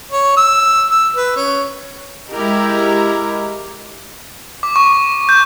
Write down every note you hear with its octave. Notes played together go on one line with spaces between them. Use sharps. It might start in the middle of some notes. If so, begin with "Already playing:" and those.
C#5
E6
E6
B4
C#4
G#3 E4 G4 A#4 D#5
D6
C#6
G6